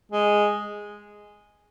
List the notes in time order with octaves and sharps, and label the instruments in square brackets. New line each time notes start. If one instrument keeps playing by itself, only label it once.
[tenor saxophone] G#3